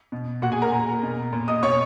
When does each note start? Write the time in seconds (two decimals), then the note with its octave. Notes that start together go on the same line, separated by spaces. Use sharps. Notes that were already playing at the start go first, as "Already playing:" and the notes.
0.12 B2
0.42 A#2 F#4 F#5
0.52 G#4 G#5
0.62 A#4 A#5
0.72 A#2
1.03 B2
1.33 A#2
1.48 D#5 D#6
1.63 B2 C#5 C#6